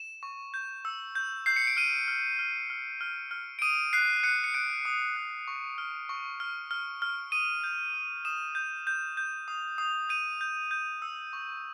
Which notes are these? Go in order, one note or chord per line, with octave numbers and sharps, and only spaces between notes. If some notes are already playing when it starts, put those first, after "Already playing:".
Already playing: E7
C#6
G6
E6
G6
G6 C7
C#7
D7
F6 D#7
F6
F6
F6
F6
F6
D7
D#6 D#7
F#6 C7
F#6 C#7
C#7
F#6 D7
D#6
F#6
C#6
F6
C#6
F6
F6
F6
D#6 D#7
G6
D#6
D#6 E7
G6
G6
G6
D#6
D#6
G6 D#7
G6
G6
E6
C#6